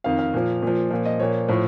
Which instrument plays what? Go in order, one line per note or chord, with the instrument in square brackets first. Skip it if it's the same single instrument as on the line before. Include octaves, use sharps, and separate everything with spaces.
[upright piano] F2 D#3 F5
F5
A#2 F3
A#2 F3
A#2 F3
D#5
A#2 F3 C#5
A2 F3